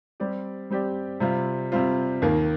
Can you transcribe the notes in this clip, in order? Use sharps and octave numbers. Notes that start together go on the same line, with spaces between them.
G3 C4 G4 D5
G3 C4 G4 D5
C3 G3 C4 F4
C3 G3 C4 F4
D#2 D#3 A#3